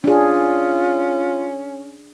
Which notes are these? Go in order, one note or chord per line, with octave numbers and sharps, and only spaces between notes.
C#4 D4 F4 G#4